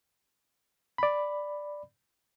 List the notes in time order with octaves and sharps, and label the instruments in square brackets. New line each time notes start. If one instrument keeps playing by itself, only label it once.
[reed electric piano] D5 B5